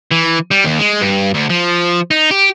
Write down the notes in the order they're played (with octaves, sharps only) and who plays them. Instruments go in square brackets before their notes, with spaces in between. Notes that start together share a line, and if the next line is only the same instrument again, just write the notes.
[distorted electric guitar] E3
G3
D#2
G#3
G2
D2
F3
D#4
G4